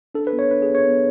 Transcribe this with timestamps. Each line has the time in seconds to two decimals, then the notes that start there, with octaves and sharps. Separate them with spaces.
0.15 D4 A4
0.27 B4
0.33 B3
0.39 C#5
0.51 D4 B4
0.62 G#4
0.69 B3
0.75 C#5
0.86 B3